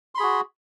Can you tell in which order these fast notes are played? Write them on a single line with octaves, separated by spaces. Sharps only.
C6 B5 G#4 F#4